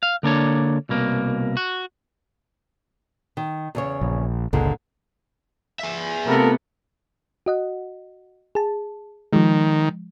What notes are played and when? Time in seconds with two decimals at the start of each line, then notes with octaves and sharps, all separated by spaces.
0.03 F5
0.23 D3 A#3 D4 C#5
0.89 C2 B2 A#3
1.57 F#4
3.37 D#3
3.75 E2 C#3 C#5
4.01 A#1
4.53 G1 C#2 A#2 D3 G#3
5.79 G#4 E5
6.26 C3 A3 B3 F4 A4 A#4
7.46 F#4 D#5 F#5
8.55 G#4 A5
9.33 D#3 F3 G#3